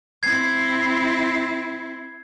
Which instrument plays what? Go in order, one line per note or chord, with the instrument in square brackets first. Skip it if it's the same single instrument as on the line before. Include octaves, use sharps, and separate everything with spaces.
[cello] C4 E4 [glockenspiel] G#6 C7